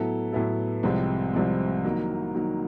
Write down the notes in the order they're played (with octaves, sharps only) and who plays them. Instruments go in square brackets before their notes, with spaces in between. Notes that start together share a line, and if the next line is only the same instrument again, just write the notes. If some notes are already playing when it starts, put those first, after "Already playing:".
Already playing: [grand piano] A2 F#3 B3 E4 A4
A2 F#3 B3 E4 A4
C2 C3 F3 G#3 C4
C2 C3 F3 G#3 C4
D#3 F#3 A#3
D#3 F#3 A#3